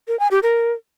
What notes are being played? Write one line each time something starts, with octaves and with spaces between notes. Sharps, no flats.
A#4
G#5
G4
A#4